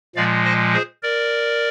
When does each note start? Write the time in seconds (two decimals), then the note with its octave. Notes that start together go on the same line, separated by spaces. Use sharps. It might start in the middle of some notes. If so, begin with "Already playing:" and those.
0.16 A#2 F3 G#3 D5 F5
0.44 C5 D#5
0.73 G#4 C5
1.03 A#4 D5